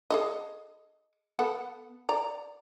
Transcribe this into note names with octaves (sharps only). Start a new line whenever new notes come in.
G#4 A4 D#5
B3 A4 F#5
D5 A#5